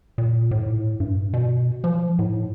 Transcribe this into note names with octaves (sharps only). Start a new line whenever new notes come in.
A#2
A2
G2
B2
F3
A2